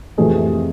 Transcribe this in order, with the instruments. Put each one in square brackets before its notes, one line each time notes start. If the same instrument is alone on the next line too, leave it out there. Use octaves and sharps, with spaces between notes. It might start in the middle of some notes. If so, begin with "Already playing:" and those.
[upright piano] F2 C3 E3 A3 G#4